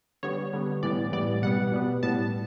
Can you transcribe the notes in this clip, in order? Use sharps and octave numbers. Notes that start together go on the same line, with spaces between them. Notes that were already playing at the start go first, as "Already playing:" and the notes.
D3 G3 B3 C#5
D3 G3 B3
A2 E3 G3 B3 D5
A2 E3 G3 B3 D5
B2 G3 B3 F#5
B2 G3 B3
A2 G3 B3 A5